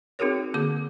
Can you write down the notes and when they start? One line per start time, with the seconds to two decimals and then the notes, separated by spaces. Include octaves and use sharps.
0.19 C4 D#4 F#4 G#4 A#4 C#5
0.54 D3 A#3 G#4 D6